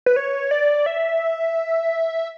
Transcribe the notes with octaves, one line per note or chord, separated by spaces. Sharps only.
B4
C#5
D5
E5